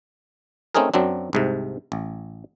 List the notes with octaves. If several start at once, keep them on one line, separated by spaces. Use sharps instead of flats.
A3 C4 C#4 D#4 G#4 A#4
F#2 F#3 C4 D4
C2 G#2 C3
A1